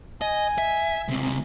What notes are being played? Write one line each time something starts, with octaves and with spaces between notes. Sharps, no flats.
D#5 G#5
E5
C#2 C3